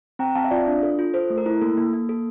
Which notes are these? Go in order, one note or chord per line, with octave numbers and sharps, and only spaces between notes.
C4 G5 A#5
C4 F5 A5
E5
F4 D5 F5
D4
A4
F4
A4 C5
A3
A#4
E4
A#3 A4
A#3
A#3
A4